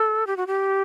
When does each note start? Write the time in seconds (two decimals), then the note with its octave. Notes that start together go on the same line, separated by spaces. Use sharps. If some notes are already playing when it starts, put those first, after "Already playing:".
Already playing: A4
0.27 G4
0.37 F#4
0.47 G4